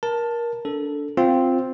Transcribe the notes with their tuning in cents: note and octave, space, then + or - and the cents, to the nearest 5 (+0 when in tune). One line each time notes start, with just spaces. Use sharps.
A#4 +20 A5 +5
D4 -20 A4 +0
C4 +0 F4 +0